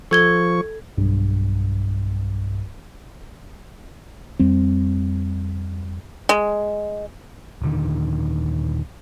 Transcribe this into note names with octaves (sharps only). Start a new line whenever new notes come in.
F3 A4 C#6 G#6 G7
B1 G2
F2 G3 C4
G#3
D#1 D3 D#3